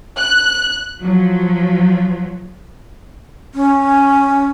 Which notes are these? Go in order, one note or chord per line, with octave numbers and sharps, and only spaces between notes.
F#6
F3 F#3
C#4